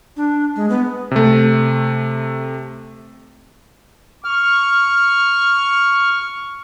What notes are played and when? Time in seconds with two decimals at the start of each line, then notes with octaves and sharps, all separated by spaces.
0.17 D4
0.56 G#3
0.70 B3
1.11 C3 A3
4.24 C#6 F6